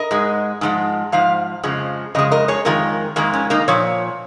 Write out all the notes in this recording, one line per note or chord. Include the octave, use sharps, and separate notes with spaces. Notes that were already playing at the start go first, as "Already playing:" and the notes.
Already playing: A#4 D#5
G#2 G#3
G#2 F3 G#3
G#2 F3 F5
F2 C#3 F3 G#3
F2 C#3 G#3 D#5
A#4 D#5
G#4 C#5
F2 D#3 G#3 F4 A#4
F2 D#3 G#3 A#3
C#4
A#3 D#4
A#2 F3 C#5